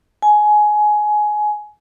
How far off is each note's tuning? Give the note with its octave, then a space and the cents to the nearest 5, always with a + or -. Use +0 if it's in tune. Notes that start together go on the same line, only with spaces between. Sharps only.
G#5 +20